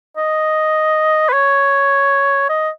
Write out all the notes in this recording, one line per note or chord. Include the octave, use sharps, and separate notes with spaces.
D#5
B4
C#5
D#5